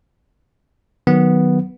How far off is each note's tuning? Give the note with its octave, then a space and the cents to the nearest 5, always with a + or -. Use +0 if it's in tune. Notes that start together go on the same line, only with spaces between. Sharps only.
D#3 -10 F#3 +0 B3 +0